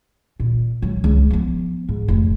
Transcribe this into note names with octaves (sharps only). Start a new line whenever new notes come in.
A#2
F#3 G#3
C#2
F3 B3
G#2
F1